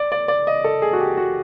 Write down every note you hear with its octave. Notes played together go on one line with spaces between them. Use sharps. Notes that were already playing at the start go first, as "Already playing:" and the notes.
Already playing: D5
D5
D5
D#5
A4
G#4
F#4
G4
F#4